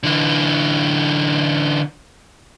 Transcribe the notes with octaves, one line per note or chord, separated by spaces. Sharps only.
D3 E3